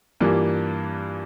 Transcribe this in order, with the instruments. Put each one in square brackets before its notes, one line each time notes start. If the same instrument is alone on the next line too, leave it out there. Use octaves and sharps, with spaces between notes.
[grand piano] G2 E3 G3 A#3 F4